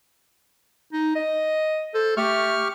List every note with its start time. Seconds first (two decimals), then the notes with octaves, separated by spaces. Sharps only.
0.93 D#4
1.16 D#5
1.94 A4 C5
2.17 A3 G4 C#6 F6